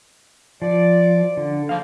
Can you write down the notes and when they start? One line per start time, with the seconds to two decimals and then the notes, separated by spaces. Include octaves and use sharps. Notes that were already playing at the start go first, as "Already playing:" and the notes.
0.62 F3 D5
1.37 D3
1.69 C#3 F3 A#3 F5